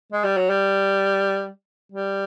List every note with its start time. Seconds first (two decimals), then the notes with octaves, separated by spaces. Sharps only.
0.12 G#3
0.24 G3
0.37 F#3
0.49 G3
1.92 G3